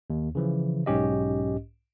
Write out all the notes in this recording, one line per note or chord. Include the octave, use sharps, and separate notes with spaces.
D#2
C#3 E3 F3
B1 G#2 C#4 G4 D#5